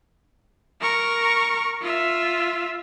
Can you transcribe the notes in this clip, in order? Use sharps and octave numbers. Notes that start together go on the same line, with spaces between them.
A#4 C#6
F4 E5